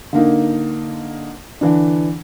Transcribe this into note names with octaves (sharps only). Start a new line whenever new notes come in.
D3 A#3 D#4
D3 E3 D4